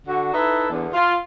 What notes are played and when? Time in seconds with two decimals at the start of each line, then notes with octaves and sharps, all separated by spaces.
0.07 D3 F#4
0.34 D#4 E4 A4 B4 E5
0.70 E2 D3
0.93 F4